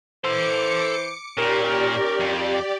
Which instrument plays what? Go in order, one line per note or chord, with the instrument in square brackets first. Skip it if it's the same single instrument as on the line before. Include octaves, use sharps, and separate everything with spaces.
[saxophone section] E3 C5 [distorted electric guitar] A4 C6 [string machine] D6 C#7
[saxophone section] D#2 C#4 A#4 [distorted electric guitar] A#2 [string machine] G4 D5
[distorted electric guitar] F2